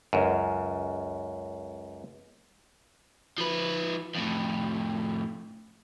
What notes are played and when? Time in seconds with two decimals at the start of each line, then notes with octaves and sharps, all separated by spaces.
0.13 C#2 F#2
3.38 F3 B4
4.15 F2 A2